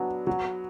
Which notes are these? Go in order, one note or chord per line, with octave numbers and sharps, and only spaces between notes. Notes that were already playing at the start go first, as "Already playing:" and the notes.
Already playing: F#3 B3 D4
F#3